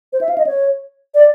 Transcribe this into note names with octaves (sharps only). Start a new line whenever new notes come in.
C5
E5
F5
D#5
C#5
D5